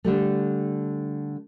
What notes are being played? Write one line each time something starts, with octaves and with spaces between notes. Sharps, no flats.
D3 G3 A3